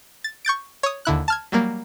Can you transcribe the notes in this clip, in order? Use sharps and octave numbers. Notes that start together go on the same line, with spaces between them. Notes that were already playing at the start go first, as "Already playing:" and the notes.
A6
C#6 G6 A6 D7
C#5 D#6
D#2 D3 E4 F#6
A5 F6 G#6
F#3 G3 A#3